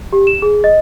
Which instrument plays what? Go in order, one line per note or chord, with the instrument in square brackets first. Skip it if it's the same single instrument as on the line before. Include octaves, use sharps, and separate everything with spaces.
[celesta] G4
E7
G#4
D#5